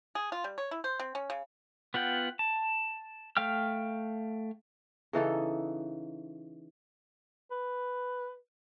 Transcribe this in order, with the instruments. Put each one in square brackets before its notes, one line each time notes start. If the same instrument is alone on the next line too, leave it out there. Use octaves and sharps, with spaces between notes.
[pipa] G#4
F4
G3
C#5
E4
C5
C4
C#4
C#3
[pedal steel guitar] B3 F4 F#5 G5
A5
A3 F5 G5 F6
[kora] C#3 E3 D#4 A4
[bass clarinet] B4